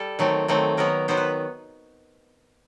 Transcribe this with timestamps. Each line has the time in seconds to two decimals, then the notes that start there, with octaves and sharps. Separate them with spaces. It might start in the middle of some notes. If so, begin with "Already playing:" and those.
Already playing: G3 A4
0.19 D#3 F#3 A3 C4
0.48 D#3 F#3 A3 C4
0.77 D#3 F#3 B3 A#4
1.08 D#3 F#3 B3 C5
1.17 B4